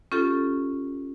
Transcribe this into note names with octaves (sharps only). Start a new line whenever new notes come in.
C#4 F4 G4 A4